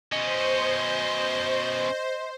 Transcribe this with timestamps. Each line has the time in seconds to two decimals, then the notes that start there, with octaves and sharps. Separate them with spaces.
0.12 B2 C#4 C5 D#5